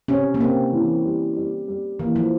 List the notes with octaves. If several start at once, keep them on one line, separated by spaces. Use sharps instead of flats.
C3 C#4
A#3
C3 C4
E3
G3
G3
G3
E3 A#3
F3